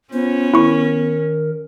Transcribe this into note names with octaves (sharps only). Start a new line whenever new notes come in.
B3 C#4 F4 C5
D#3 E4 A#4 C#6